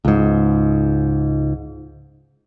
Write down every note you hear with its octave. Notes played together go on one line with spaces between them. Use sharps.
C#2 G#2